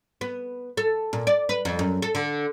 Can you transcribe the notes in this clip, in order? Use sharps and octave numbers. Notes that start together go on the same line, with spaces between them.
B3
A4
A#2
D5
B4
F2
F#2
A4
D3